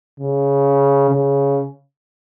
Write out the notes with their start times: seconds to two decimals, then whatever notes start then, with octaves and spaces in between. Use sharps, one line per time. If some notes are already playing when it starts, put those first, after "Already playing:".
0.20 C#3
1.10 C#3